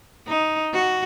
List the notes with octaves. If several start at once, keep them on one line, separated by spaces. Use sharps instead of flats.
D#4
F#4